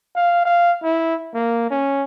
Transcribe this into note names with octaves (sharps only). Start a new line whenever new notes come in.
F5
F5
E4
A#3
C#4